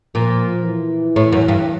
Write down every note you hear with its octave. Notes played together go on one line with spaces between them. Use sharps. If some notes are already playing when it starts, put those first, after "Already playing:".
A#2 F3
E3
A2
F#2
G2